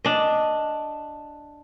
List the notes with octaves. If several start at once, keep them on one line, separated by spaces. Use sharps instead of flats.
D4 D#5